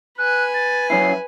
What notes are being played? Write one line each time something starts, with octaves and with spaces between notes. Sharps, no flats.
B4 G#5 F#6
A6
F#2 C#4 E4 C7